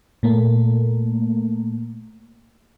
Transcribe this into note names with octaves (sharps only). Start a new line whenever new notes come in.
A#2 A3 A#3